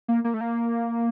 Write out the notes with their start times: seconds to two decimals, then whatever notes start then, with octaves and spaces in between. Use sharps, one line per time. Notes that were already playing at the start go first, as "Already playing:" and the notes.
0.08 A#3
0.24 A#3
0.34 A3
0.41 A#3